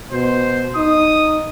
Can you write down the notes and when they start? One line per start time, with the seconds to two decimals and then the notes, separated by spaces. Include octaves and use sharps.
0.12 B2 C5
0.76 D#4 D#6